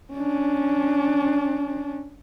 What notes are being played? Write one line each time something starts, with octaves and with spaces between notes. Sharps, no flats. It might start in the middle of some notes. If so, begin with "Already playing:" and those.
C#4 D4